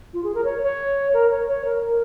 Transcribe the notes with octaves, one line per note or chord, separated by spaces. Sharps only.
F4
G#4
A#4
C#5
C#5
A#4
C#5
C#5
A#4
A#4